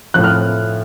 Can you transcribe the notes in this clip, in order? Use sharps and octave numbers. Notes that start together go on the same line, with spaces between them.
A2 F3 F#6
F6